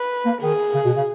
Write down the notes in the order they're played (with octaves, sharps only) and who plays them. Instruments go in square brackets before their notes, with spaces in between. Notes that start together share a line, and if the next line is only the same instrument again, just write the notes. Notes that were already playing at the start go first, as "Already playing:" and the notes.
Already playing: [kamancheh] B4
[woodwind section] A#3
[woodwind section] D#3 [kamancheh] G#4
[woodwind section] C#3
B2
C#3